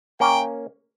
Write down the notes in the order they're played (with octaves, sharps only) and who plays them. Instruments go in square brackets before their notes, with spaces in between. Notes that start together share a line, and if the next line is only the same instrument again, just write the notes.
[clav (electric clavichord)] A#3 C#4 [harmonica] G5